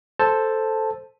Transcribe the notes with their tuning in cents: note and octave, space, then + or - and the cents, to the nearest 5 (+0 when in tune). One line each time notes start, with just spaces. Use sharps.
A4 +0 C5 +0 A5 +0